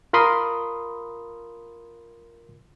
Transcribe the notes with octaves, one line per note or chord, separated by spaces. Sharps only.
F4 A#4 B5 C6 D#6